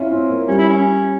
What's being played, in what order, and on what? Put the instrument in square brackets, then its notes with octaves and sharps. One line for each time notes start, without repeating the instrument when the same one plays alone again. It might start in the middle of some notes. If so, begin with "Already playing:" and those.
Already playing: [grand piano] C#4 E4 F4
C4
A#3
[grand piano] G3 [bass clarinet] C#4
[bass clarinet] E4
C#4